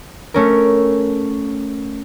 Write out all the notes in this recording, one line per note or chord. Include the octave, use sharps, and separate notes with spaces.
A3 C#4 A#4